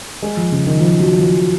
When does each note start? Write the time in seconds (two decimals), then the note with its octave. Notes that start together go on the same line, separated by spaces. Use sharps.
0.22 G#3
0.37 F3
0.52 C#3
0.66 D#3
0.81 F3
1.00 F#3
1.19 F3